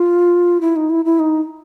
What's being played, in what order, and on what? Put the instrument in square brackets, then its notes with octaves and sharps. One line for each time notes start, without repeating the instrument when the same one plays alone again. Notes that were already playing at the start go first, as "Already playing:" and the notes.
Already playing: [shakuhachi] F4
E4
D#4
E4
E4
D#4